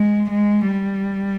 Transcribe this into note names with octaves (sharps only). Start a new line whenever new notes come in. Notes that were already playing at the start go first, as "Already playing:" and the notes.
Already playing: G#3
G#3
G3